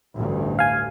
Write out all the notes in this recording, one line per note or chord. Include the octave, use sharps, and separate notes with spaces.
A1 D2 G2
F5 G#5